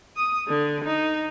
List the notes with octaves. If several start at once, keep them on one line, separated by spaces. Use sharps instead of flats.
D#6
D3
D#4